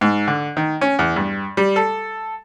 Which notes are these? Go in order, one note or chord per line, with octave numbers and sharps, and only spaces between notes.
G#2
D3
D#3
C#4
E2
G2
G3
A4